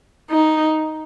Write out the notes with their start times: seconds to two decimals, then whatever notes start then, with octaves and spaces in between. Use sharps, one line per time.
0.31 D#4